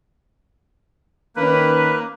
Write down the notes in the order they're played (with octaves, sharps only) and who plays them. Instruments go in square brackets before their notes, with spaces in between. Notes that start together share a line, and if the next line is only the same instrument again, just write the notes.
[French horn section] D#3 C#4 [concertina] A#3 [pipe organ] B4